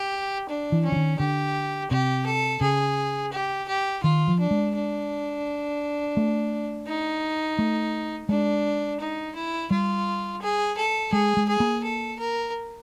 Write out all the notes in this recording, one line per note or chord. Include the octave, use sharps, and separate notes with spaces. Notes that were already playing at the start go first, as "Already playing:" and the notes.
Already playing: G4
D4
E3
C#4
E3
D#3
D3 G4
C3 G4
A4
C#3 G#4
G4
G4
D#3 F4
F3
D4
G#3
D4
A3
D#4
A3
G#3 D4
D#4
E4
G3 F4
G#4
A4
G#3 G#4
G#3
G#4
A#3
A4
A#4